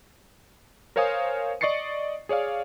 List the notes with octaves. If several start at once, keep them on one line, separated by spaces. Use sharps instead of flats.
A#4 C5 C#5 F5 G#5 D#6
D5 D#5 C#6 A6 C7 C#7
G#4 C#5 D5 F5